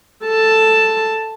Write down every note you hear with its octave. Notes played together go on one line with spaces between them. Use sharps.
A4 A5